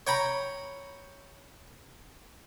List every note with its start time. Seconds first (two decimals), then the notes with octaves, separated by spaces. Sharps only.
0.07 C#5 G5 A#5 B5